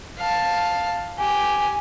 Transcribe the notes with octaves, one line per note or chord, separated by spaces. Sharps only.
F5 A5
G4 G#5